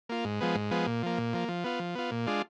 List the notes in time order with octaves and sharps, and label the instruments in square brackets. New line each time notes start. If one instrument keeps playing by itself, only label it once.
[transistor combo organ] A#3 F4
G#2
F3 G#3 B3
G#2
F3 G#3 B3
A#2
F3 A#3
A#2
F3 A#3
F3
B3 F4
F3
B3 F4
A#2
G#3 D4 F4